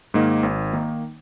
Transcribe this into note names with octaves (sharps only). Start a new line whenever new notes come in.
G#2 D#3 A#3 D#4
G#1
D#3 A#3 D#4